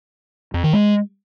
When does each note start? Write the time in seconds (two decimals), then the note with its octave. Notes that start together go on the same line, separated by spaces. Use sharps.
0.54 F2
0.64 D#3
0.73 G#3